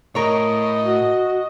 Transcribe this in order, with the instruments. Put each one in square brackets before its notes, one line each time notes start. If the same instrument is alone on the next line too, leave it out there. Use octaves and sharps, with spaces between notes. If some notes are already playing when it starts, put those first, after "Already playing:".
[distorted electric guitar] A2 [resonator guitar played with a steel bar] A#4 C#5 [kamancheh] D#5
[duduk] F#4